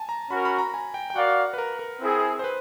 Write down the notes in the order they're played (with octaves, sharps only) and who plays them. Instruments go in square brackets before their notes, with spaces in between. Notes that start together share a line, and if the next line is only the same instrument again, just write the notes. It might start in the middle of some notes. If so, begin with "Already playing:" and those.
Already playing: [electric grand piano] G#5 A5
A#5
[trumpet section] C#4 F#4 A#4 [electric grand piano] B5
[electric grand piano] B5
A#5
G#5
G5
G5
[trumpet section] F#4 A#4 D5 F5 [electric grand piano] F#5
[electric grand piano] B4
A#4
A#4
[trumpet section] C4 E4 G#4
[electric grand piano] C5
B4